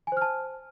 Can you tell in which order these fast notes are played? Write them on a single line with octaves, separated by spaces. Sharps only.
G#5 C5 F6 A5